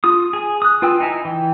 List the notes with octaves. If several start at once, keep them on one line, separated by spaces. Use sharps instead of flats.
F4 D#6
G#4 G#5
D#6 F#6
F4 B4 G5 G#5 E6
D#4 E4 G#5
E3 G5